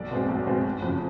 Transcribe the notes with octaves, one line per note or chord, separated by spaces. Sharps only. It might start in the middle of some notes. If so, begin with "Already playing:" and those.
Already playing: B1 D5
B2 G#3 C4
B1
B2 G#3 C4
F#1
F2 C#3